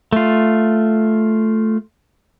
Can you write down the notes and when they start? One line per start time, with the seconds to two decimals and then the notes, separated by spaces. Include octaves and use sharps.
0.13 A3 F4